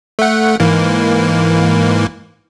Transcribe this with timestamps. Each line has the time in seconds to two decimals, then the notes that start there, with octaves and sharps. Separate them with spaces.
0.19 A3 F#5
0.60 G#2 E3 A#3